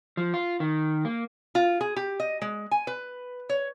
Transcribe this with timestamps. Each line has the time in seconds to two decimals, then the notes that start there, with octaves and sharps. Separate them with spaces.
0.17 F3
0.34 F4
0.60 D#3
1.05 A#3
1.55 F4
1.81 G#4
1.96 G4
2.20 D#5
2.42 G#3
2.71 G#5
2.87 B4
3.49 C#5